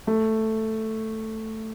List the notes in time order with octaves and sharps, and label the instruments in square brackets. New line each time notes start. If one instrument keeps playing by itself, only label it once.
[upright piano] A3